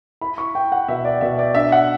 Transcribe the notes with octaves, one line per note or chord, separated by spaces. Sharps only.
E4 B5
C#6
E4 G5
F#5
B2 E5
D5
B2 E5
D5
D4 E5
F#5